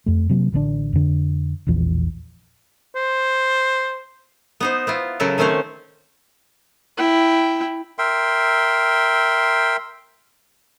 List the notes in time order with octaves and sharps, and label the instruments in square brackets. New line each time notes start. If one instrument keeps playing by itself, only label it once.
[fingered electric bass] F2 A3
C3 F#3 A3 A#3
A1 D3 F#3 D4
F2 D3
E1 A#1 E2 F3
[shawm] C5
[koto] B3 D#4 C5
B3 E4 F4
C#3 F#3 E4 A4 A#4
D#3 A3 C4 C#4 C5 C#5
[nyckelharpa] E4 G5
[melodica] A#4 E5 G5 C6